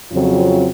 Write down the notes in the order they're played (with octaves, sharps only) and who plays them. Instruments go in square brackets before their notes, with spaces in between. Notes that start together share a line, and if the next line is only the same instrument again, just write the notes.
[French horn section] F2 C#3 F#3 C4 F4